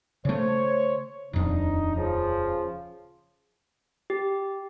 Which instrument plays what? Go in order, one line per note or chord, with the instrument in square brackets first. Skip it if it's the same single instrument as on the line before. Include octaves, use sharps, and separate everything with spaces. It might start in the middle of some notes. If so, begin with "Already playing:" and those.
[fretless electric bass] C#3 A3 [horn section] C5 C#5
[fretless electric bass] D#1 F2 [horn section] D4 D#4
[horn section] C#3 F3
[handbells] G4